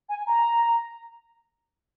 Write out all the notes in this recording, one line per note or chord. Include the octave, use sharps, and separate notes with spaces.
G#5
A#5